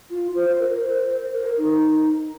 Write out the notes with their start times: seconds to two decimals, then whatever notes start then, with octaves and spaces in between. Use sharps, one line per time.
0.11 F4
0.35 C5
0.59 A#4
0.84 C5
1.09 C5
1.33 A#4
1.58 D#4